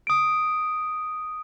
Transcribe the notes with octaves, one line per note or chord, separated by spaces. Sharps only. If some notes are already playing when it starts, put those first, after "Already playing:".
D#6 D7